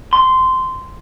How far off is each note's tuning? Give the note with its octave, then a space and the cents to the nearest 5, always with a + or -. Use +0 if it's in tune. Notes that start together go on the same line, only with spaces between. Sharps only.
C6 -15